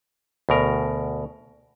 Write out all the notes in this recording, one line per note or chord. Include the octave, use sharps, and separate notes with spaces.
D2 B2 A#4